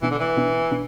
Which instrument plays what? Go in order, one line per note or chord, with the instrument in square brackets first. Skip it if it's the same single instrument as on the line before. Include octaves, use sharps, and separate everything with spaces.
[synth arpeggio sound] B2 B3 D4 [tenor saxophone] E3
[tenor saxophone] D3
E3
[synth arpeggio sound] B2 B3 D4
B2 B3 D4